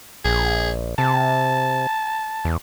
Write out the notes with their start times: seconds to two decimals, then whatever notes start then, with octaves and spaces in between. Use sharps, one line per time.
0.25 A#1 G#4
0.98 C3 A5
2.45 E2